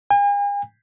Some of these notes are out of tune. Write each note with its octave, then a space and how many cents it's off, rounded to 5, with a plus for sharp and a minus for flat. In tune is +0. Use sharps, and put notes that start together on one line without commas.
G#5 -45